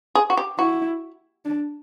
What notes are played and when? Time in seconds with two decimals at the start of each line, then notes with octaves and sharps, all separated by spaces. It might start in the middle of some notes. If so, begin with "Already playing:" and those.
0.15 G#4
0.30 F#4
0.37 G4
0.59 E4 F#4
1.45 D4